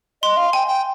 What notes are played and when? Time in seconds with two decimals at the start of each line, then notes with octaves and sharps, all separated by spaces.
0.23 D#5 C6
0.37 F5
0.53 G5 G#5
0.67 G5